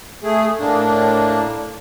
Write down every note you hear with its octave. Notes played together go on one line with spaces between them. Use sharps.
A3 G#4
A2 A#3 D4